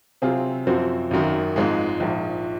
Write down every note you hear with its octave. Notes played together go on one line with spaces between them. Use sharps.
C3 F#3 C4 F4 G#4
F#2 F3 C4 F#4
G#1 F#2 D#3
G#1 G#2 F3 G#3
A#1 G#2 F3